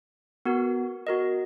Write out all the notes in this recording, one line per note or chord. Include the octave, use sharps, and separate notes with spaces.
B3 F#4 A#4
F#4 A#4 D#5